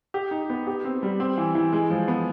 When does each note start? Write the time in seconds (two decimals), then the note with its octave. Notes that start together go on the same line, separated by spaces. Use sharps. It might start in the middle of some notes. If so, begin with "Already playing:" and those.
0.14 G4
0.31 D#4
0.50 B3
0.67 G4
0.85 C4
1.03 G3
1.20 C4
1.38 E3
1.55 E3
1.73 G#3
1.90 F3
2.08 B3